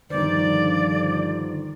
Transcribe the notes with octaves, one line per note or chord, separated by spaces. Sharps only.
G2 D3 D#3 F3 C5 D5